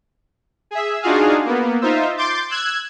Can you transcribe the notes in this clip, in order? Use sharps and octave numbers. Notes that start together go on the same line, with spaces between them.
G#4 E5
D4 D#4 F4 F#4 G#4 F5
A#3 B3
D#4 F4 C5 E5
C6 D6 G6 A6
E6 F#6 G#6